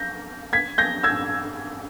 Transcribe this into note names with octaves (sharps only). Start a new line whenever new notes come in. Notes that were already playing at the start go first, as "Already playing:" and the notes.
Already playing: G6 A#6
G#6 B6
G6 A#6
E6 G#6